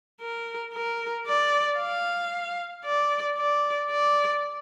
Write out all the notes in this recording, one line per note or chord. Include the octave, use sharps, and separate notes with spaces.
A#4
A#4
D5
F5
D5
D5
D5